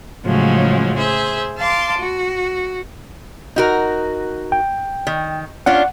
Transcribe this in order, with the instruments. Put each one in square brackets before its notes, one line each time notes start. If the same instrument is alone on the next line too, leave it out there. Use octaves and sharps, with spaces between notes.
[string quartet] A2 C#3 F3 F#3 G#3
G#4 C5 E5
F5 A5 C6 D6
F#4
[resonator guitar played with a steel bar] D#4 F#4 A#4
[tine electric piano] G5
[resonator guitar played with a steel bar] D#3
[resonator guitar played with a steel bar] C#4 D4 F4 [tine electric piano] F#5